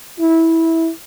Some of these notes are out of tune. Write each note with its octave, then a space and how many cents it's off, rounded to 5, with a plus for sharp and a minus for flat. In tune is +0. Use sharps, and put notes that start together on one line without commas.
E4 -15